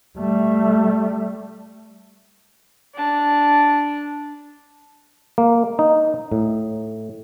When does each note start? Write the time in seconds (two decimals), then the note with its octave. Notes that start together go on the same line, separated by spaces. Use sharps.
0.18 G3 A3
2.95 D4 A5
5.38 A#3
5.79 D#4
6.32 A2